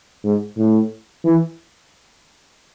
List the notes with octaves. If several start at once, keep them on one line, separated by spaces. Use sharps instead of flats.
G#2
A2
E3